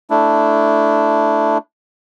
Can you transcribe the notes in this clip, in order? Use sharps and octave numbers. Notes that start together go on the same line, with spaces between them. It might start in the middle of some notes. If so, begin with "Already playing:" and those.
A3 D4 E4